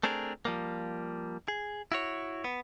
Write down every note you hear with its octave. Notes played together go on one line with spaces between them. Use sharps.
A3 C4 D4 G#4 A#4
F3 G3 A#3
G#4
E4 F#4 C#5
B3